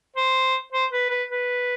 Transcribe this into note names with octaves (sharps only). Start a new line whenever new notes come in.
C5
C5
B4
B4
B4